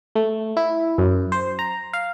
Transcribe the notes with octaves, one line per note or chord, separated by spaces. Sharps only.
A3
E4
F#2
C5
A#5
F5